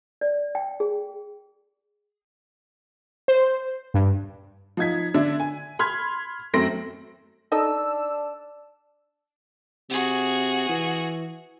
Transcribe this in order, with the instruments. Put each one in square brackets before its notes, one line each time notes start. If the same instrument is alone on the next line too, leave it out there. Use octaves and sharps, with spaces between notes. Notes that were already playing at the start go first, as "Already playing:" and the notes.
[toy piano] D5
G5
G#4
[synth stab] C5
G2
[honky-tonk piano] F3 D#4 G#6 B6
D3 D4 E5
G#5
B5 C6 F6 G#6 B6
F#2 A3 C4 C6 A#6 D7
[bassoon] D4 [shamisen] D#4 A4 D#5 [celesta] A5 [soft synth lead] E6
[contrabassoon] C3 [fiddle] F#4 G#4
[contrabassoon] E3